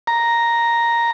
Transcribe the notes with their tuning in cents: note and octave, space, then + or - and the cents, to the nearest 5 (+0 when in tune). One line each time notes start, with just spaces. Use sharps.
A#5 +0